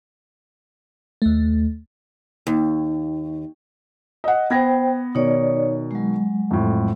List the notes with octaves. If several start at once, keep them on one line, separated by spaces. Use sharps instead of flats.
D#2 A3
D#2
D#5 F#5
B3 C5 G5 G#6 A#6
B2 D#3 D#4 C#5 D5
F#3 G#3
F2 A2